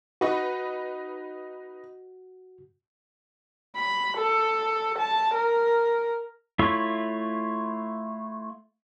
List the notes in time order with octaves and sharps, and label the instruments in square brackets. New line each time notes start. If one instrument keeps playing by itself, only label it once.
[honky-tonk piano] D#4 B4 [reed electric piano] F#4
[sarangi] B5
A4
A5
A#4
[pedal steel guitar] A3 E4 F4 C#5 E5